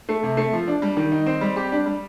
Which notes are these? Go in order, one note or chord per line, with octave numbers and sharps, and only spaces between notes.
A3
C3
A3
F3
D4
G3
D#3
D#4
C4
G3
G4
D4
G3